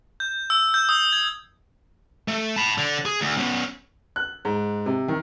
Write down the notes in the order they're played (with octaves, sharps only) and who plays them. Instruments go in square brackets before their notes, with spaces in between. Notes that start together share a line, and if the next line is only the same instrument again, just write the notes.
[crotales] G6
E6
G6
D#6
G#6
[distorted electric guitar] A3
A5 B5
D3
G#4
D2
B3 C#4
[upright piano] F#6
G#2
C3
D#3